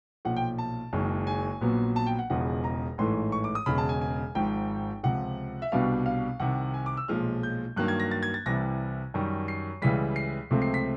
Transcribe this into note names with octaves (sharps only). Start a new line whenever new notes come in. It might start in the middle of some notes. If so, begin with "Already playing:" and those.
B1 A#2 F3 F#5
G5
A5
F#1 F#2 D#3 G#3
G#5
A#1 A#2 F#3 B3
A5
G5
F#5
E1 E2 C#3 F3 F#5
A#5
A1 G#2 E3 A3 C6
C#6
D6
D#6
E1 E2 C#3 B5
A5
G#5
G#5
G#1 G#2 F3 G5
C#2 C3 F3 F#5
E5
C2 B2 G3 B3 D4 F5
F5
C2 C3 D#3 F#5
G#5
D6
E6
B1 A#2 F3 G#3 F6
G6
G2 D#3 F#3 A#3 F#6
G#6
A#6
A6
G#6
A6
C2 C3 E3 G3 A#6
F#2 D#3 G3
C7
C#2 C#3 E3 G3 B6
C7
C#2 C3 F3 A3 C4
C7
B6